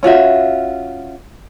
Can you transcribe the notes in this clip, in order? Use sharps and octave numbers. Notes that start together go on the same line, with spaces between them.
C#4 F4 F#4 E5